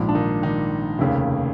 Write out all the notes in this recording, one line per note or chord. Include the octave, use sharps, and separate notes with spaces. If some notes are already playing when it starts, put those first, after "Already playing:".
Already playing: A#1 G#2 F3
D4
D#3 D#4
D#3 D#4
F1 D#2 C#3